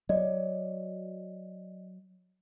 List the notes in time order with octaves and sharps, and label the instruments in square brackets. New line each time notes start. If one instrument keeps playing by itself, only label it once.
[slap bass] F#3 [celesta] D5 D#5